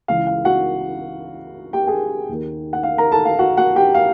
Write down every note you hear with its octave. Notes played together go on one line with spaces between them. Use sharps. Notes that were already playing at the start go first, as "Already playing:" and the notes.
C#2 C#3 E3 F5
F5
F#4 F#5
G4 G5
G#4 G#5
D#2 D#3
F#5
F5
A#4 A#5
A4 A5
F5
F#4 F#5
F#4 F#5
G4 G5
F5